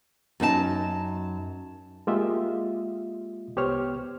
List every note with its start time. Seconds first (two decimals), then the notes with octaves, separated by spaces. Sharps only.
0.40 F#2 D#4 G#4 A5
2.07 G#3 A#3 F4 G4 D#5 E5
3.56 C2 B3 G4 C5 C#5 F6